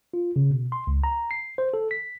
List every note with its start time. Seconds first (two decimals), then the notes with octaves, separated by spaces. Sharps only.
0.14 F4
0.36 C#3
0.51 B2
0.72 C6
0.87 C#2
1.04 A#5
1.31 C7
1.58 C5
1.74 A4
1.91 B6